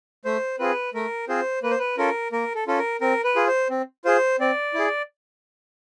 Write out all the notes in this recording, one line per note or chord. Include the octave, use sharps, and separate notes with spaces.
A3 C5
C4 F4 G#4 B4
A3 A#4
C4 F4 G#4 C5
A#3 B4
C5
B4
C#4 F4 A4 A#4
A#3 A#4
A4
C#4 F4 A4
A#4
C4 A#4
B4
F4 G#4
C5
C4
F4 G#4 C5
C4 D5
E4 G#4